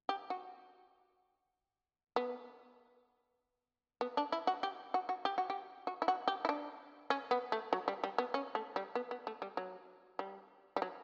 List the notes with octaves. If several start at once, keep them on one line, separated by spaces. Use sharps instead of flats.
G4
F#4
B3
B3
D4
E4
F#4
G4
F#4
F#4
G4
F#4
G4
F#4
E4
F#4
G4
E4
D4
C#4
B3
A3
F#3
G3
G3
B3
C#4
A3
G3
B3
B3
A3
G3
F#3
G3
G3
F#3